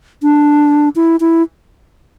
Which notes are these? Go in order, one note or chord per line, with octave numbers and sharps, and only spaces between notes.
D4
E4
E4